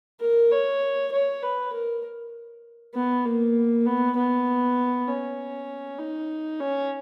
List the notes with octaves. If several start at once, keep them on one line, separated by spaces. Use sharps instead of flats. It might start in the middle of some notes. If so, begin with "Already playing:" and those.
A#4
C#5
C#5
B4
A#4
B3
A#3
B3
B3
C#4
D#4
C#4